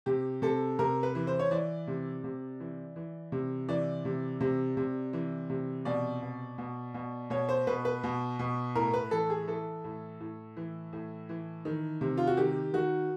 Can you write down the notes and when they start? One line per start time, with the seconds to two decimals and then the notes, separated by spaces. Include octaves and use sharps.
0.06 C3 G4
0.42 C3 A4
0.79 C3 A#4
1.03 B4
1.15 E3
1.27 C5
1.39 C#5
1.51 E3 D5
1.87 C3
2.24 C3
2.60 E3
2.96 E3
3.32 C3
3.69 E3 D5
4.05 C3
4.41 C3
4.77 C3
5.13 E3
5.50 C3
5.85 B2 D5
6.22 B2
6.58 B2
6.94 B2
7.30 B2 C#5
7.49 C5
7.67 B2 B4
7.85 B4
8.04 B2
8.39 B2
8.75 A2 A#4
8.93 B4
9.11 E3 A4
9.30 G#4
9.48 E3 A4
9.84 A2
10.20 A2
10.57 E3
10.93 A2
11.29 E3
11.65 D#3
12.01 C3
12.17 F4
12.27 F#4
12.37 D#3 G4
12.74 D#3 F#4